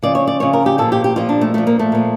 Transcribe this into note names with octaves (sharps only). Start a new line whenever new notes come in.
C#3 F3 D5
C#5
D5
C#3 F3 C#5
A#4
G4
A#2 F3 A4
G4
G4
A#2 F3 F4
D4
A3
A#2 F3 A3
A#3
A3
A#2 F3